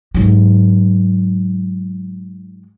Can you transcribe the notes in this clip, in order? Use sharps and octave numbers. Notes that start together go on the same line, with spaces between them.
G#2 F#3